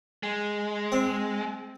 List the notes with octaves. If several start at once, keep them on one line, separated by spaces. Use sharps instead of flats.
G#3
C4